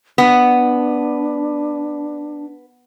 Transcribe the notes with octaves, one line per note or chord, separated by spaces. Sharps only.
B3 D4